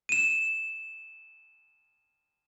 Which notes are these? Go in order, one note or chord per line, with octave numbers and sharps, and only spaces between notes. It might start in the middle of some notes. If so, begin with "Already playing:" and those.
D#7 E7